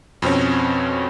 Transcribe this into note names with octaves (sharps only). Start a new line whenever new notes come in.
F2 B2 C4 C#4